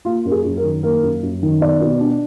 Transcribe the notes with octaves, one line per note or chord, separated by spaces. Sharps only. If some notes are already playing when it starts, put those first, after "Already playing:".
A#3 F4
F#2 A#4
G#4
F#2
A#4
D#3
A#3 A#4
F#2
F#2
D#3
B3 D5
B2
D4